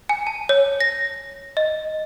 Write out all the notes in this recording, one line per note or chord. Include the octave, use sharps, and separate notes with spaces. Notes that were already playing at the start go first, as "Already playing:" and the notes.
G#5
A5
C#5
A#6
D#5